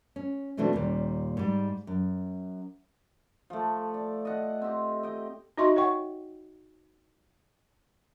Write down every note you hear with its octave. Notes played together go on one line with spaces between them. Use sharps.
C#4
B2 E3 A3 C4 D4 F#4
D#2 A#2 G3 C#4
G#2 G3
F#2
F3 A3
D5
D#5 F#5
C4 G4
D#5 G5
D#4 F#4 D#5 E5 C6 C#6
C#5 F#5 G5 C#6